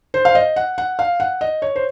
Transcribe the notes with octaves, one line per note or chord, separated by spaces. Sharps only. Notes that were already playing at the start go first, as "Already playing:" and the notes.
C5
F5
D#5
F#5
F#5
F5
F#5
D#5
C#5
C5